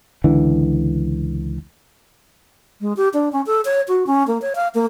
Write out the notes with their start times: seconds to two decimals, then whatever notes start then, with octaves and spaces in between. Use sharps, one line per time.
0.24 C#2 D3 E3
2.81 G#3
2.97 G4
3.14 D4
3.32 C#4
3.46 A4
3.65 C#5
3.88 F#4
4.07 C#4
4.28 A#3
4.42 C#5
4.56 F5
4.75 A#3